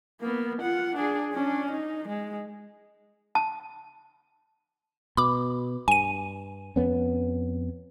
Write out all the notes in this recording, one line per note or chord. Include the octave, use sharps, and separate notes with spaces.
A#3 B3
F4 F#5
D4 G#4
C#4 D4
D#4
G#3
A5
B2 B5 D6
G2 G#5 D#7
F2 B3 C#4